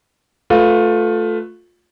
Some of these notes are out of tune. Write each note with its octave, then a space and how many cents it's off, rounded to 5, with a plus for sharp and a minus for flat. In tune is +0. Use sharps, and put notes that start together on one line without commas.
A3 +0 F4 +20 B4 +10